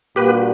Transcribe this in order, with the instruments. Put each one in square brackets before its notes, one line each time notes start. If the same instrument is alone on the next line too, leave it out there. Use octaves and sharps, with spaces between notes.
[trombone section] A#2 G3 A#3 D4 F#4 [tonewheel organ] G4 B4